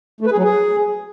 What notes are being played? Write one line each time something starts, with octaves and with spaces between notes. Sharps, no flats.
A3
B4
G#4
F#3
G#4